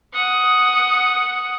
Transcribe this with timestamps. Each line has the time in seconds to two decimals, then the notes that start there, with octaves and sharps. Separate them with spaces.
0.14 F#5 D#6